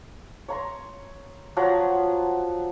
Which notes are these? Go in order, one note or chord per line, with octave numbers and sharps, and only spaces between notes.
C#5 A#5 C6
F3 F#3 F#5 A#5